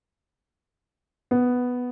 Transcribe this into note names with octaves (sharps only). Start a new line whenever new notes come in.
B3